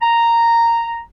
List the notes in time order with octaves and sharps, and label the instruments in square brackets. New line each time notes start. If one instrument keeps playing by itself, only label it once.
[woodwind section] A#5